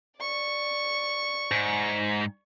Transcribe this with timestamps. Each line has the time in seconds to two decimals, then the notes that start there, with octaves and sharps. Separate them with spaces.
0.19 D5 C#6
1.51 G#2